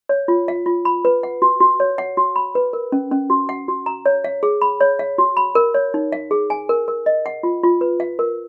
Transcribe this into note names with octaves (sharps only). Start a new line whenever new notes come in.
C#5
F4
F5
F4
B5
B4
F#5
F#4
F#4
C#5
F#5
F#4
B5
B4
A#4
C#4
C#4
F#4
F#5
F#4
A#5
C#5
F5
G#4
B5
C#5
F5
F#4
B5
A#4
C#5
D#4
F5
G#4
G#5
A#4
A#4
D#5
F#5
F4
F4
B4
F5
A#4